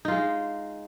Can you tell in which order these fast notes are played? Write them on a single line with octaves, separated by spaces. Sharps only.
D#4 F4 G#3